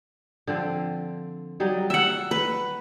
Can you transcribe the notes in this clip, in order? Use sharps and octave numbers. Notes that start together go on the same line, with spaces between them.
D3 F3 C4
F#3 G3 D#4
E5 F#5
B4